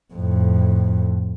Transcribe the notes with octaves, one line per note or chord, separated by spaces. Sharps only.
F2 A2